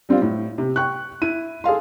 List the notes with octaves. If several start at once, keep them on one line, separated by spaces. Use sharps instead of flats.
G3 C4 D4 F4
A2
C3
G5 C#6 F#6
E4 D#7
G#4 A4 F5 C6